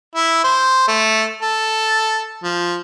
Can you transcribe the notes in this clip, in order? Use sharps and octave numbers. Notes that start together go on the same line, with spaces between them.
E4
C5
A3
A4
F3